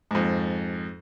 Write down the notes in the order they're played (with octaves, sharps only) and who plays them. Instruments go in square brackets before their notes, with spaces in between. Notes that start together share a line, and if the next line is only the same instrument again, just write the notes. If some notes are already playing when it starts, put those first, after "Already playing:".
[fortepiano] F2 G#2